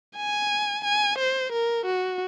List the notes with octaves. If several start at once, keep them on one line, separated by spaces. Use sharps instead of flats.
G#5
G#5
C5
A#4
F#4